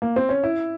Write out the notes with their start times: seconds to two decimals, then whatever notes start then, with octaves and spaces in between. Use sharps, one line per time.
0.02 A#3
0.16 C4
0.29 C#4
0.44 E4